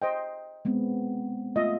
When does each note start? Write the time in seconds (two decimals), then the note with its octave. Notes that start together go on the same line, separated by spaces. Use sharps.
0.02 C5 D#5 G5
0.65 G#3 B3 C4
1.56 A3 F4 D#5 E5